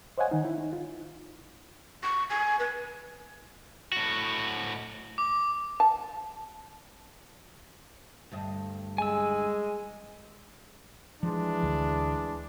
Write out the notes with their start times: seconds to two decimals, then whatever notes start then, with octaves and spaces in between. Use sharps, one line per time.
0.18 C5 C#5 D#5 F5 F#5 G#5
0.31 D#3 D#4
0.45 E4
0.58 D#4
0.73 F4
2.03 C#6
2.30 G#5
2.60 B4
3.92 A2 F#4
5.18 D6
5.80 A5
8.32 D2 G2 D#5
8.98 G#3 G#5 E6
11.23 E3 F3 G#3 D4
11.63 D2